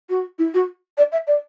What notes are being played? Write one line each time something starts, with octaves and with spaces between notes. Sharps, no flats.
F#4
E4
F#4
D5
E5
D5